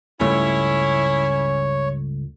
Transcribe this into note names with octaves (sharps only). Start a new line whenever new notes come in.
C#2 G2 A3 C#4 E4 C#5